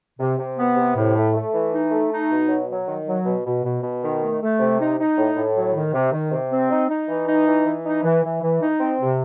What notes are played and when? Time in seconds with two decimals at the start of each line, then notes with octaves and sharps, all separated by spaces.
0.20 C3
0.39 C3
0.58 B3
0.77 C3
0.96 A2
1.15 A3
1.34 A3
1.53 E3
1.73 D#4
1.92 A3
2.11 D#4
2.30 B2
2.48 F#3
2.68 F#3
2.88 D#3
3.06 F#3
3.25 B2
3.45 B2
3.64 B2
3.83 B2
4.02 D#3
4.22 A3
4.41 A3
4.60 C3
4.78 D#4
4.98 D#4
5.17 A2
5.35 A2
5.55 F#3
5.74 D#3
5.93 C3
6.12 D#3
6.31 C3
6.51 C4
6.70 D#4
6.89 D#4
7.09 E3
7.27 D#4
7.47 E3
7.66 E3
7.84 D#4
8.03 E3
8.23 E3
8.42 E3
8.61 D#4
8.80 C4
9.00 C3